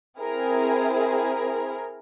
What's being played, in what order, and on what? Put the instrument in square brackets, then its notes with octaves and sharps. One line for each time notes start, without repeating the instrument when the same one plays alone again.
[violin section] C4 E4 G#4 A#4
A#4